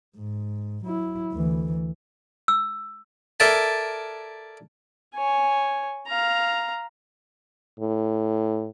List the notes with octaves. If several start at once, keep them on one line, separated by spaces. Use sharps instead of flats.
G#2
F#3 E4
D2 E3
E6
A4 A#4 D5 E5 G#5 A5
C#5 G#5
F5 A#5
A2